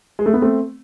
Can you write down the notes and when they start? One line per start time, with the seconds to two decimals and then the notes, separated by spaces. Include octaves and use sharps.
0.19 G#3
0.26 A3
0.34 B3
0.41 A3 C4